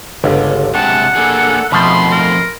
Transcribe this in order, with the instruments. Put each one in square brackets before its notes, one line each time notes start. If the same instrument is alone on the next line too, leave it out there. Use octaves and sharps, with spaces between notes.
[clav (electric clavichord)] G1 C#2 [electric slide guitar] D3
[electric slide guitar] C3 G#3 D4 [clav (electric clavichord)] G4 [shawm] F#5 [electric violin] A5
[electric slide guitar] A#3 D4 G#4 [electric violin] A4
[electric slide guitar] F2 D#3 A3 [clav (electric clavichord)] B2 F3 [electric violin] B5 C6
[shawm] A#4